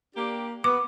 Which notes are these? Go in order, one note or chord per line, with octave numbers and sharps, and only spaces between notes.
A#3 D4 G4
B3 D6